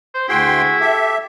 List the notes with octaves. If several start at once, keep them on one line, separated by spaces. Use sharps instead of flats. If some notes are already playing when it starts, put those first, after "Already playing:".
C5
D2 E4 F#4 G#4 G5 C6
G4 A4 E5